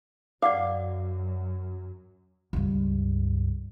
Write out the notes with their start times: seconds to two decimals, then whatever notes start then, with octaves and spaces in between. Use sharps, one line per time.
0.42 F#2 F#3 D5 F5 F#5 D6
2.53 C#2 G2